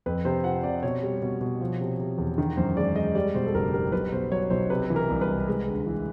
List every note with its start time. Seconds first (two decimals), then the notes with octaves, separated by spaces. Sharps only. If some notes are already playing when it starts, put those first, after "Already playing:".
0.06 F2 B4
0.25 C3 C5
0.44 F3 F#5
0.63 C3 D5
0.83 B2 C#5
1.03 G3
1.22 B2
1.41 B2
1.61 F3
1.81 C3
1.99 C3
2.18 E2
2.38 D#3
2.57 F#2 C5
2.77 G#3 D5
2.96 G#3 D#5
3.15 G3 D5
3.34 B2 C5
3.46 A4
3.54 F#1 A#4
3.73 G3 A#4
3.92 B1 B4
4.12 B2 C5
4.32 F#3 C#5
4.50 B1 C5
4.70 C3 B4
4.90 E3
4.96 A#4
5.10 C2
5.21 B4
5.28 C3
5.48 G#3
5.68 D2
5.86 E3